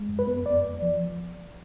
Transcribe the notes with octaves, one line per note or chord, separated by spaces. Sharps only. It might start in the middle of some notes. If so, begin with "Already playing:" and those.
Already playing: G#3
F#2
B4
B3
F2 D5
F2
F3